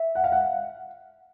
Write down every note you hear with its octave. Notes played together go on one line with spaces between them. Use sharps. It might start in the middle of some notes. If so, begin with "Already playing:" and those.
Already playing: E5
F#5
F5
F#5